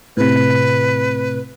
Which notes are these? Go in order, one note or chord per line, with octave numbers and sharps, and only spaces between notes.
A2 C3 B4